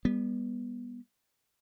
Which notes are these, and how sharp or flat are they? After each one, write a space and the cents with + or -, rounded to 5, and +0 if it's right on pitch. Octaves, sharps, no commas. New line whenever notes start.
G3 +30 B3 -20